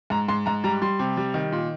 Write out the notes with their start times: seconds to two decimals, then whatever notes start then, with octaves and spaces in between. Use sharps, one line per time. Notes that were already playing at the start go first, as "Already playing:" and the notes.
0.10 G#2 A#5
0.28 G#2 C6
0.46 G#2 A#5
0.64 G3 A#5
0.82 G3 C6
0.99 C3
1.17 G3
1.34 D#3
1.52 A#2